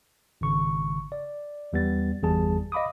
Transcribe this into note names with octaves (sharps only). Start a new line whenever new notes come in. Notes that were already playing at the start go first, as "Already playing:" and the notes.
G#1 C#3 C#6
D5
E2 G3 B3 A6
G1 E2 G3 G#4 A5
D#5 F5 B5 D6 D#6